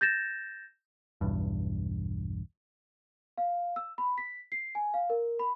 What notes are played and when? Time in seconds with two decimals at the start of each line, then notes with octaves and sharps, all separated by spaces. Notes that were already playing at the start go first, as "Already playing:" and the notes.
0.01 G6 A6 A#6 E7
1.21 B1 E2 G2
3.37 F5
3.76 E6
3.98 B5
4.18 B6
4.52 C7
4.75 G#5
4.94 F5
5.10 A#4
5.39 B5